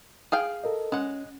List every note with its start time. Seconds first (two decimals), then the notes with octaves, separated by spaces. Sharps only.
0.32 G#4 F5 G5
0.64 A4 A#4 D#5
0.92 G#3 C#4 F#5